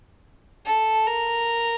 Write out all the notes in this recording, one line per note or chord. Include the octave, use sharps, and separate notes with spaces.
A4
A#4